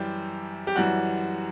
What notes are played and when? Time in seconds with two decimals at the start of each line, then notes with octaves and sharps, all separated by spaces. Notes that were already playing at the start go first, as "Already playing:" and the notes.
Already playing: F#2 E3 G3 G4
0.67 G4
0.76 F#2 E3 G3 F#4